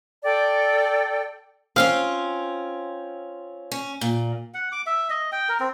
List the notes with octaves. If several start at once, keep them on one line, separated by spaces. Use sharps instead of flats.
A4 D5 G5
C4 C#4 F4 F5
C#4
A#2
F#5
D6
E5
D#5
G5
A#4
C4